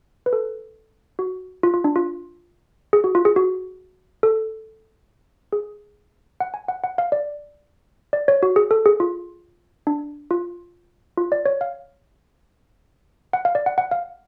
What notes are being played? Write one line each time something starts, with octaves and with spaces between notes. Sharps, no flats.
B4
A4
F#4
F4
F4
D4
F4
G#4
F#4
F4
G#4
F#4
A4
G#4
F#5
G#5
F#5
F#5
F5
D5
D5
C#5
F#4
G#4
A4
G#4
F4
D4
F4
F4
D5
C#5
F5
F#5
F5
D5
F#5
F#5
F5